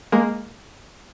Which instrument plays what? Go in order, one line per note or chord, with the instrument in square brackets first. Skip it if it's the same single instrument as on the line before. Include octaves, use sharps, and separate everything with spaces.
[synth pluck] G#3 A#3